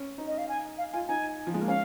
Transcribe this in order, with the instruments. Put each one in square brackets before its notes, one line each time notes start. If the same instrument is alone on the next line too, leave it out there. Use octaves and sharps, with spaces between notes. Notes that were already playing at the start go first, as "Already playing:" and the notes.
Already playing: [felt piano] C#4
D#4
[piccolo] D#5
F5
G#5
F5
[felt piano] F4 [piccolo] G#5
[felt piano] D#4 [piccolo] G#5
[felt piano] F3
G#3
A#3
[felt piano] C#4 [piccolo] F5